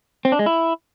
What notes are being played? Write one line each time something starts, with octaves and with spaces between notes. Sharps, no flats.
C4
D4
G#3
E4